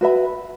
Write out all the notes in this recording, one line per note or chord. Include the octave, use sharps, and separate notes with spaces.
F#4 B4 E5 B5